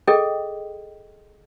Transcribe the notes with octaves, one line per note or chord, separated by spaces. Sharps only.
G#4 A4 D#5 G5